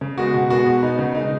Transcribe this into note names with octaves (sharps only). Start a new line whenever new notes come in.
C#3
G#3 B3 F#4
B2
G#3 B3 F#4
B2
B3 D#4
C#3
G#3 D#4